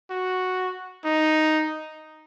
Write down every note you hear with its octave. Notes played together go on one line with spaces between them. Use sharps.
F#4
D#4